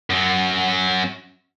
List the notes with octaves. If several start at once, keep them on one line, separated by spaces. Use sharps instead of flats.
F#2 F#3